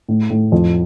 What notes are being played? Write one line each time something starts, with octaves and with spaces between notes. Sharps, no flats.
A2
A2
F2